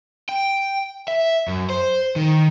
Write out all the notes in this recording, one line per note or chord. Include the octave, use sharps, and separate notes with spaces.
G5
E5
F#2
C5
D#3